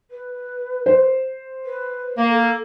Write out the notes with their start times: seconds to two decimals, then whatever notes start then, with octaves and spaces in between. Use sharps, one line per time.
0.10 B4
0.86 C5
1.65 B4
2.18 A#3
2.29 A4